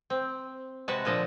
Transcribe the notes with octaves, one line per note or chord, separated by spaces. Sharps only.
C4
C3 G#3 F#4 B4 A5
A#2 D3 F3 D#5 A5